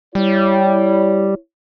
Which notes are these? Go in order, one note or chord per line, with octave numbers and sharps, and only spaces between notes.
G3 E4 C#5